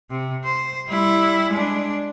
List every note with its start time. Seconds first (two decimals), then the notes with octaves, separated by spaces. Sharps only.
0.10 C3
0.44 C5
0.88 G3 E4
1.49 G#3 D4